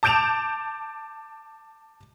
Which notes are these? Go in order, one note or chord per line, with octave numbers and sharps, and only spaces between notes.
A5 D6 G6 D7 E7 F7